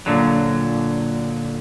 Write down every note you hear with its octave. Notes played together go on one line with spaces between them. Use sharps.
A#2 D3 F#3